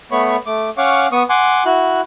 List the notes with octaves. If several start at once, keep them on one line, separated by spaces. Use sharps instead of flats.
A3 B3 C#5 B5 C#6
A3 D6
C#4 C#5 F5 F#5 C#6 D6
B3 C#6 D#6
F#5 G#5 C6 D6
E4 F#4 F#6